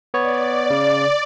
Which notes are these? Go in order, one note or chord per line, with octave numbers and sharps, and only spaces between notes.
B3 C#5 D5
C#3